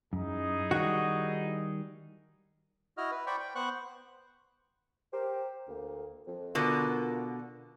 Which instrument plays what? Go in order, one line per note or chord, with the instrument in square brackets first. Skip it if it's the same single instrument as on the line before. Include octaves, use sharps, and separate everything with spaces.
[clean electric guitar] F#2 [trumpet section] D#4 E4 G#4
[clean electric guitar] D#3 G3 [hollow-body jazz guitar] F#4
[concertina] E4 F#4 D#5 F6
B4
C5 D5 G5 B5 C#6
G5
B3 C5 F#5 C#6 F#6
[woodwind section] G4 A#4 C5
D2 A#3
F2
[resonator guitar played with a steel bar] B2 D3 [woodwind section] F4 A#4